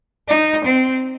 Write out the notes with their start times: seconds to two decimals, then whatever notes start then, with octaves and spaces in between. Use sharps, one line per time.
0.28 D#4
0.64 C4